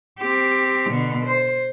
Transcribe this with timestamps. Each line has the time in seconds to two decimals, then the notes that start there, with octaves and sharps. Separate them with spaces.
0.19 C4 G4
0.90 B2 D3
1.25 C5